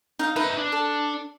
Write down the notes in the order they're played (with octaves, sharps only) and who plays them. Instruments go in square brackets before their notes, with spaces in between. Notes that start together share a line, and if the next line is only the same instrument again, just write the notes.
[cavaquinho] D#4 F5
[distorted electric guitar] D#4 E5 [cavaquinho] B4
[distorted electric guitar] D4
[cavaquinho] A4